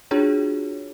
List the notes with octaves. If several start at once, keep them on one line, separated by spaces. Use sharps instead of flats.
D4 F4 F#4 G#4 C#5